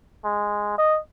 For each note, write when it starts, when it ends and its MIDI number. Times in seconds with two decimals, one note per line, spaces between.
0.25 0.74 56
0.78 0.99 75